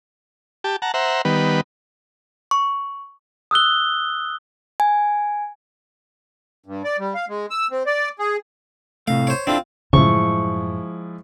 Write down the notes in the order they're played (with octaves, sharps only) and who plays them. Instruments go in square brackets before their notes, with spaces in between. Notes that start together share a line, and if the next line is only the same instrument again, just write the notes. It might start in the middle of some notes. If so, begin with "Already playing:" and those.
[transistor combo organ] G4 A5
F#5 A5 A#5
C5 E5 F#5 A#5
D#3 G3 B3 B4
[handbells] C#6
[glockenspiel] D#6 E6 F#6 G7
[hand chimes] G#5
[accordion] G2
D5
G3
F5
G#3
E6
C4
D5
G#4
[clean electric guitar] A2 C3 A3 [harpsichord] F5
[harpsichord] C5 C#5
[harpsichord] C4 F4 [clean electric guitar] D4 E4 A4
[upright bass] F#2 A2 [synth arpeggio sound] C#3 [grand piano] F3 G#3 E4 [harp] C#6